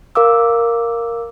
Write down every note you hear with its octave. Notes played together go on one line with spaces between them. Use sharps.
A#4 F5 D6 E6